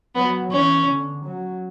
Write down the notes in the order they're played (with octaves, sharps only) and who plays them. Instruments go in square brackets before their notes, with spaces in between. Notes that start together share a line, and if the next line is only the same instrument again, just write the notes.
[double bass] F#3 [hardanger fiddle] B3
[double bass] E3 [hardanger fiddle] C#4
[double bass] D3
F#3